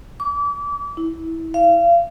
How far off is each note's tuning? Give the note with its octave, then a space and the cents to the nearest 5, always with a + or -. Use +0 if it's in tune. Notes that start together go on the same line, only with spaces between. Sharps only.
D6 -35
E4 -20
F5 -35